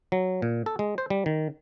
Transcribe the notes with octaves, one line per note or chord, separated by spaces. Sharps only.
F#3
A#2
A4
G#3
C5
G3
D#3